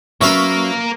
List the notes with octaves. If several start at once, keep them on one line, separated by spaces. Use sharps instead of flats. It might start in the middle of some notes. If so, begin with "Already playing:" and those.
F#3 A#3 C#4 F4 B4 E5 C#6